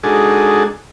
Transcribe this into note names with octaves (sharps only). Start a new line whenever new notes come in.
G#3 D4 D#4 F#4 G#4 A4